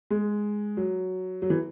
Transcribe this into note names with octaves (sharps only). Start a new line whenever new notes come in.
G#3
F#3
F#3
E3